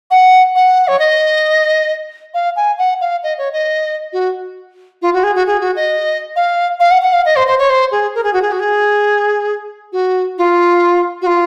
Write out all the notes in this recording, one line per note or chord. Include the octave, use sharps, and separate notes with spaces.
F#5
F#5
C#5
D#5
F5
G#5
F#5
F5
D#5
C#5
D#5
F#4
F4
F#4
G#4
F#4
G#4
F#4
D#5
F5
F5
F#5
F#5
F5
D#5
C5
C5
C#5
C5
G#4
A#4
G#4
F#4
G#4
F#4
G#4
F#4
F4
F#4
F4